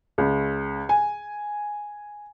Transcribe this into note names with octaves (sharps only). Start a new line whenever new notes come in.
C#2
G#5